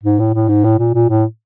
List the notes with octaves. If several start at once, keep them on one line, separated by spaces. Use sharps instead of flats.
G#2
A2
A2
G#2
A2
A#2
A#2
A2